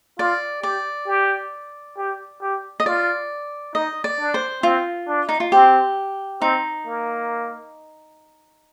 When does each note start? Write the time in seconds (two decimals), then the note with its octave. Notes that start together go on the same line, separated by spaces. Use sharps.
0.19 F4 D5
0.63 G4 D5
1.07 G4
1.97 G4
2.42 G4
2.80 D#5
2.86 F4 D5
3.75 D#4 D#5
4.04 D5
4.19 D4
4.34 C5
4.63 C4 F4
5.08 D4
5.29 D#4
5.40 F4
5.52 C4 G4
6.42 C4 D#4
6.86 A#3